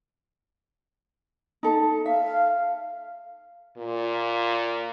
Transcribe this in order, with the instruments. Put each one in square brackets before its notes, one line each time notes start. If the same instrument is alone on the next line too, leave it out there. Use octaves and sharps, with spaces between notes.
[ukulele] D#4 A4
[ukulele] E5 [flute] F5
[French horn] A#2